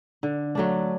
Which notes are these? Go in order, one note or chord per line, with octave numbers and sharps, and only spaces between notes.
D3
F#3 A3 D4